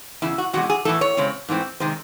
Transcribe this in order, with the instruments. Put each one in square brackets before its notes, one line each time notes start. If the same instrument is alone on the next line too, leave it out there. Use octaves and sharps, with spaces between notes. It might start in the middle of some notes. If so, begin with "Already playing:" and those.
[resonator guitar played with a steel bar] E2 C#3 E4
F#4
E2 C3 G#3 F#4
G#4
A2 E3 A3 A4
C#5
C#3 G#3 C4
G#2 E3 A3 C4
C3 D#3 G#3 C4 C5